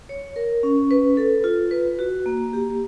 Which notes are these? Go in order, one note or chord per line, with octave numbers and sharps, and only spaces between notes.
C#5
A#4
C#4
B4
A4
F4
B4
F#4
A#3
G4